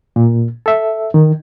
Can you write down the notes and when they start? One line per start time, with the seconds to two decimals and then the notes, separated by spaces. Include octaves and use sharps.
0.16 A#2
0.66 A4 E5
1.14 D#3